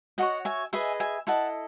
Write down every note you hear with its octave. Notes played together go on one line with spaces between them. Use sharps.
F#4 A4 C#5 D#5 F#5
E5 G#5
G#4 B4 D#5 E5 G#5
E5 G#5
E4 A4 D#5 F#5 A5